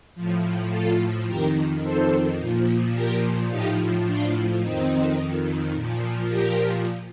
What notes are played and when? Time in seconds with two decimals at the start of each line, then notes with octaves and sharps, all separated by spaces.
0.15 A2 F3
0.71 F4 A4
1.27 F2 D#3 G4 A#4
1.82 A4 C5
2.39 A#2 F3
2.95 G4 A#4
3.50 A2 F3 D#4 G4
4.06 D4 F4
4.61 F2 D#3 C4 D#4
5.73 A#2 F3
6.29 G4 A#4